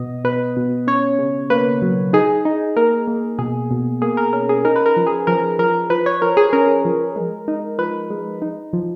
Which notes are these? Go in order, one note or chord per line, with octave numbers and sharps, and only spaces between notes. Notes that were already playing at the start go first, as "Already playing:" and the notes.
Already playing: B2 B3 D#5
B2 B4
B2
C#4 C#5
C#3
A#3 B4
F#3
D#4 G#4
D#4
A#3 A#4
A#3
B2 G#4
B2
A#3 G#4
A#4
C#4 A#4
G#4
D#4 A#4
B4
A#4
F3
G#4
F3 A#4
F3 A#4
F3 B4
C#5
F3 A#4
G#4
C#4 A#4
F3
G#3
D#4
F3 B4
G#3
D#4
F3